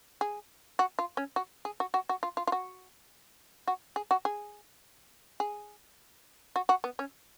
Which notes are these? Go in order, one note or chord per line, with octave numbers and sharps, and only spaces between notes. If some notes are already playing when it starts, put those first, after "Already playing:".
G#4
F#4
F4
C#4
F#4
G#4
F#4
F#4
F#4
F4
F4
F4
F#4
F#4
G#4
F#4
G#4
G#4
F#4
F#4
B3
C#4